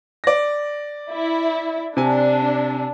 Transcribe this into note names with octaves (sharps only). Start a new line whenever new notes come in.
D5 A#6
E4
C3 D4 G#5